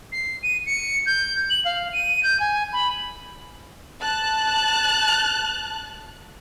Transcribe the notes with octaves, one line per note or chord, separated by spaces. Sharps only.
C7
D#7
C#7
G6
F#7
F5
D#7
G6
G#5
B5
A5 F#6